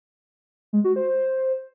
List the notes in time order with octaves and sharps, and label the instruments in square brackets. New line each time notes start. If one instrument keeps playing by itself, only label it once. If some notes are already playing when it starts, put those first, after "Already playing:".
[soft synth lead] G#3
F#4
C5